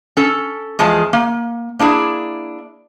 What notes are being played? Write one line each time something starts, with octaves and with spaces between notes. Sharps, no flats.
C#4 A4
E2 F3 G#3 A5
A#3
A#3 D4 E4 G#4